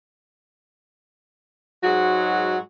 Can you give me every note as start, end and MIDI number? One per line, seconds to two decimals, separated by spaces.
1.84 2.57 44
1.84 2.57 54
1.84 2.57 56
1.84 2.57 66